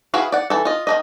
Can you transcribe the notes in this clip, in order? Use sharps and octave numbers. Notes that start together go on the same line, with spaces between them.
E4 F#4 G#4 B4 F5
D5 F#5
E3 A4
F4 D#5
D#3 A#3 D#5